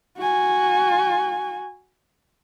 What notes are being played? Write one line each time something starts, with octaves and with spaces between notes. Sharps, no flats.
F#4 G#5